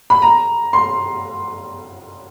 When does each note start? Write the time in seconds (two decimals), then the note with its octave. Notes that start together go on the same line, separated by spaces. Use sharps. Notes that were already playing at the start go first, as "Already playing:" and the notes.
0.10 B5
0.22 A#5
0.73 C6